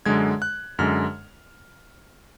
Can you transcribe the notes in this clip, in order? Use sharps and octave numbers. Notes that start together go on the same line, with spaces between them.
F#2 D3 G#3 G#6
F#6
F#2 D3 G#3 F6